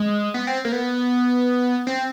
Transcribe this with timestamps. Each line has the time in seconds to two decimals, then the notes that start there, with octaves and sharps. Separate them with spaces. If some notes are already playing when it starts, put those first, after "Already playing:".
Already playing: G#3
0.34 B3
0.47 C4
0.65 A#3
0.72 B3
1.87 C4